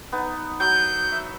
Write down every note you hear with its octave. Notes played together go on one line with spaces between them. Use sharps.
B3 D#4
F#3 G6
E5